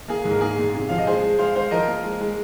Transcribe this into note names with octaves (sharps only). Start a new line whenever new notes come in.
A#3 G#4
G#2
A#4
A#3 G#4
A#2
C3
F3 F5
D#5
G#3 G#4 C5
G#3
G#3 C5 F5
G#3 C5 F5
F3 A#4 D#5
A#3
G#3
G#3